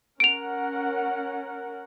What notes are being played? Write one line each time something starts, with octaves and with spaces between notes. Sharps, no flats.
C#4 A#4 F#5 D7 F7